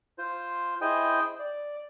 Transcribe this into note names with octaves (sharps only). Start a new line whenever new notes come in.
F4 C5
E4 G#4 C5 D#5 G5 G#5
D5